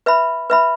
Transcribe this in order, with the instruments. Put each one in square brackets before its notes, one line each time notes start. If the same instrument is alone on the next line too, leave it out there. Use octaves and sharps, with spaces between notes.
[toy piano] B4 E5 B5
B4 E5 B5